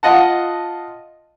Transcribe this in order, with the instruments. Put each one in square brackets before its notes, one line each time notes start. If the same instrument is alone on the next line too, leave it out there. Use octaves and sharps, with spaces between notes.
[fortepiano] F4 D#5 F#5 A5